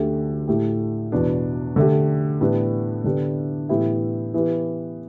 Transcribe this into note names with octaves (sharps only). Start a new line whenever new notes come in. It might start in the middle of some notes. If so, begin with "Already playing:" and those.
Already playing: D2 D3 A3 G4
A2 A3 G4
E2 B2 B3 D4
D3 A3 G4
A2 E3 B3 D4 G4
D3 B3 D4 G4
A2 E3 B3 E4 G4
E3 B3 G4